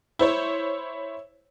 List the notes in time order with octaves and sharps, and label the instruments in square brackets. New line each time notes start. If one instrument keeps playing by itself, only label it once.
[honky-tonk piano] E4 C5 C#5